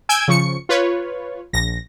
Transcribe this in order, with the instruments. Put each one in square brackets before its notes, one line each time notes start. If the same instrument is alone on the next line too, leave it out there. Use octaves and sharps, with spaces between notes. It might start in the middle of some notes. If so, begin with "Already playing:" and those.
[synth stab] G#5 E6 G6 G#6 D7
C#3 F3 C#6 C#7
F4 B4 C#5
A#1 A#6